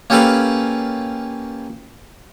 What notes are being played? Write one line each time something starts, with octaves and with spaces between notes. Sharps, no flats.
A#3 C#4 G4 A4 B4 F5